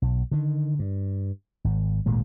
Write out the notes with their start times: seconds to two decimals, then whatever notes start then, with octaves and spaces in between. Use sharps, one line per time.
0.02 B1
0.31 D3 D#3
0.79 G2
1.64 G#1
2.06 G#1 D2 A#2 G#3